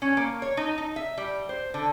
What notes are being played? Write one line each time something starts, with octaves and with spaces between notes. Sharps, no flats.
C#4
A#3
C#5
D#4
D#4
E5
G3
C5
D3